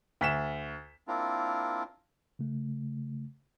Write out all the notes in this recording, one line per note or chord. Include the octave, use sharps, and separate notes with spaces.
D2 B6 E7
A#3 C4 D4 E4 F4 A#4
C#3 A3